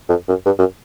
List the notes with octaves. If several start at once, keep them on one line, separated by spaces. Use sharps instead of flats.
F2
F#2
G2
F#2